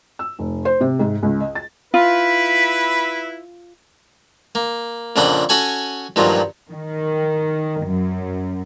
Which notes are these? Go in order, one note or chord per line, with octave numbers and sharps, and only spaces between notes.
E6
F1
C5
C3
G#2
C#2
D#5
A6
E4 F4 B4
A#3
F2 A#2 C#3 D4 F#5 B5
C#4 F#4 A4 G#5 B5 C#6
G2 A#2 D#3 F3 F#3
D#3
F#2